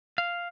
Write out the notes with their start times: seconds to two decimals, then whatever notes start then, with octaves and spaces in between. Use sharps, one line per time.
0.18 F5